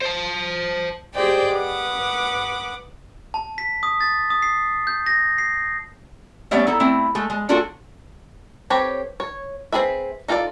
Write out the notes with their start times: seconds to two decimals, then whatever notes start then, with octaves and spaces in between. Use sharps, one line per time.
0.01 C5 A5
1.14 G4 G#4 C5 D5 D#5 G5
1.53 B4 F#5 D6 D#6
3.34 A5
3.58 B6
3.83 D#6
4.01 A6
4.30 D#6
4.42 C7
4.87 G6
5.06 A#6
5.38 C7
6.51 G3 A3 B3 C#4 C#5 D5
6.67 D#4 E4 A4
6.80 A3 C4 E4
7.15 G#3 A3
7.30 G#3
7.49 A3 D4 F4 F#4 G#4 A4
8.70 C4 G4 A4 B4 C#5
9.20 C#5
9.72 C4 D4 G#4 B4 E5
10.28 D#4 F4 A4 C5 D5